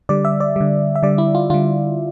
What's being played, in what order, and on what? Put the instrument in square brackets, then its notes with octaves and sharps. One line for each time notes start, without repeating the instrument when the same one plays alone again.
[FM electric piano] D3 G3 D5
E5
D5
D3 G3
E5
D3 G3 D5
E4
F4
D3 G3 F4